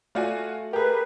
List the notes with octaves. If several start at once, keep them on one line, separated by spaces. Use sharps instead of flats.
A3 F4 F#4 D5 G#5
G4 G#4 A#4 B4